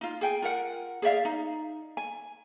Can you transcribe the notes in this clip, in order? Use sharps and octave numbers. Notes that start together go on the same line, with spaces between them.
D#4 F4
G#4 G5 G#5
F4 A#4 F#5
G#4 D5 E5 F5
D#4
G#5